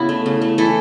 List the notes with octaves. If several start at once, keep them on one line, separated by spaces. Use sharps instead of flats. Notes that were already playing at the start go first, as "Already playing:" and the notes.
Already playing: C#3 B3 E4
A3
C#3
A3
E3 E4 A4